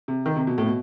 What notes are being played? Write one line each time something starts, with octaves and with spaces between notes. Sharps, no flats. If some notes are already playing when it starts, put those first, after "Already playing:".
C3
D#3
C3
B2
A2
B2